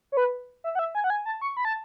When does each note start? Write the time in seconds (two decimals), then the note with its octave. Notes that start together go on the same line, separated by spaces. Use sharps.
0.12 C#5
0.17 B4
0.64 E5
0.75 F#5
0.79 E5
0.95 G#5
1.04 F#5
1.10 G#5
1.26 A5
1.42 C#6
1.57 B5
1.65 A5